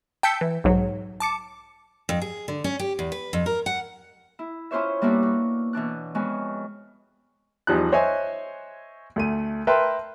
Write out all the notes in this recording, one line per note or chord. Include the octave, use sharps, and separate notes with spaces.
G5 A5 E6 G6 B6 C#7
E3
B1 G#2 F#3
A5 D6 C#7
F2
G#4
D3
C#4
G4
E2
B4
F2
A#4
F#5
E4
C#4 E4 F4 C5 C#5 E5
G3 A#3 B3 D4 E4 F#4
F#4
B2 E3 D4 F#6
F2 G#3 B3 C#4 F#4
E2 F3 G3 D#4 A5 F#6
C5 C#5 D#5 E5 G#5
D2 A3 D#7
A#4 B4 E5 G5 A5 C6